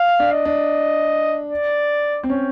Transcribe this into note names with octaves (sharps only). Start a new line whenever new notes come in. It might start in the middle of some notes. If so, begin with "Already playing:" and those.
Already playing: F5
D4
D#5
D4
D5
C4
C#4